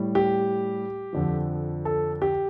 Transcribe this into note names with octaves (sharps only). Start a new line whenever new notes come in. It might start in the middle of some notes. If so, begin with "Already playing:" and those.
Already playing: A2 G3
G4
F2 D3 F3
A4
G4